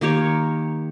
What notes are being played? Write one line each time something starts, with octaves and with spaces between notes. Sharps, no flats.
D#3 A#3 G4 C#5